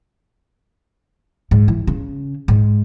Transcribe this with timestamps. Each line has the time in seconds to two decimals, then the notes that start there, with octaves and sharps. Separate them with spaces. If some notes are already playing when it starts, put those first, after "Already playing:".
1.51 G#2
1.68 E3
1.87 C#3
2.48 G#2